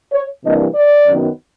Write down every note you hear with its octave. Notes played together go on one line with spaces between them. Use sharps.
C#5
C3 E3 G3 A#3 D4 D#5
D5
F#2 D#3 F#3 B3